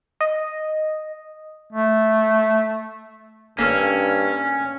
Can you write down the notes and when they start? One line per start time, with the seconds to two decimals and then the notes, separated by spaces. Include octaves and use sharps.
0.21 D#5
1.72 A3
3.59 G2 A#3 C#4 A4 C#5